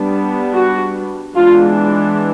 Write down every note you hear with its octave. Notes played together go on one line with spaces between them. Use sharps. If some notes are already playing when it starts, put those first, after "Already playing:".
Already playing: G3 B3 D4
F#4
E3 G#3 B3 D4 F4